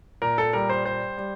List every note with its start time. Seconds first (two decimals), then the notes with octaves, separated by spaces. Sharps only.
0.22 A#2 A#4
0.38 A4
0.53 G3 A#4
0.69 C5
0.85 G3 C5
1.18 G3